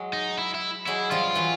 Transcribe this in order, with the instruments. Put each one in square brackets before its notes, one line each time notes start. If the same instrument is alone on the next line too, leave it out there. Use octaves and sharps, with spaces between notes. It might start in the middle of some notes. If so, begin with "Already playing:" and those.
Already playing: [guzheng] F#3 G#3
[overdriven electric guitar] D#4
E4
E4
[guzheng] F#3 G#3 [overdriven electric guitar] E4
[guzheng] F3 G3 [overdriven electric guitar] F4
[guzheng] E3 F#3